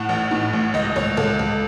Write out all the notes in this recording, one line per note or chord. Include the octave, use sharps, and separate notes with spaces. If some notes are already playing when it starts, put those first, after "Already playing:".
Already playing: A2 F#5
A1
A2
A1
C#2 D#5
C#2 C#5
C#2 A4
C#2